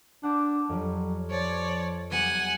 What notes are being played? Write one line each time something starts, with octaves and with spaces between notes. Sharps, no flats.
D4 F#5 D6 G6
F2 F#3 G3
F3 C#5 D5
F#3 G3 B3 F#5 G#5